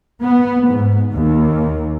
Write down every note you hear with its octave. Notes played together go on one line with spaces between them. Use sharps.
B3
G#2
D#2